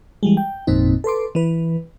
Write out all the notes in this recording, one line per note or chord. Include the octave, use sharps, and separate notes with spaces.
E3 G3 G#3
G5
G#1 F2 A#2 C4 D#4
A4 B4 C6 D6
E3 B4